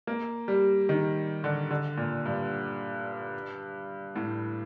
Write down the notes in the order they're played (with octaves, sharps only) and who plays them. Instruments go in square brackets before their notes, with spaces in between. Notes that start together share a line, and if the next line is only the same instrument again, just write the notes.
[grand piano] A#3
G3
D#3
D3
D3
A#2
G2
A2